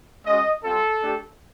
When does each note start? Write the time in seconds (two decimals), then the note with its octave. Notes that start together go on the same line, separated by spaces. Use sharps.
0.26 G#3 C#4 F#4 D#5
0.63 G3 C4 F4 A4
1.01 A3 D4 G4